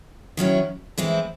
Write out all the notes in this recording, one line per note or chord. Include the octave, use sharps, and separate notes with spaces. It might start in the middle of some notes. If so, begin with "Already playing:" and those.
D#3 F#3 C#4 E4
E3 G#3 C4 E4